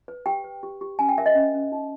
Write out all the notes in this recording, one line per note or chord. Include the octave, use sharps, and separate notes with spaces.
B4
G4 G5
B4
G4
G4
C#4 G#5
G5
A#4 E5
D#5
C#4
C#4
D#4